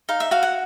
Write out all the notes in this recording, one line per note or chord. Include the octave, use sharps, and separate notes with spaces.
D#4 F5
E5
F#4 F5
F#5